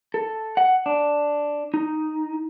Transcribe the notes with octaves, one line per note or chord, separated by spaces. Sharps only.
A4
F#5
D4
D#4